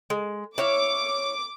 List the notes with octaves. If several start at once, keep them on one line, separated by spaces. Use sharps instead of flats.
G#3
E4 C#5 F5 D6